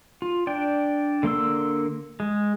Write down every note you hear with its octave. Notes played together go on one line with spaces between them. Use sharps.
F4
D4 D5 G5
D3 A#3 C6 E6
G#3